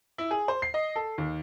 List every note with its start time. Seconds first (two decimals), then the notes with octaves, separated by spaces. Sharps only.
0.18 E4
0.31 G#4
0.48 C5
0.62 C7
0.74 D#5
0.96 A4
1.18 D#2